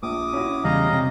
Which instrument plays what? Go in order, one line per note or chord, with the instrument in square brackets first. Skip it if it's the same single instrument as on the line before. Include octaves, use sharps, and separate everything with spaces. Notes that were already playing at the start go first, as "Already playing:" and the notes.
[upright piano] A#1 [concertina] D6 D#6
[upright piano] C#4 E4 F#4
[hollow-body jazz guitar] E2 C#3 G3 [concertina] D#5 F5 A#5
[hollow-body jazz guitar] C3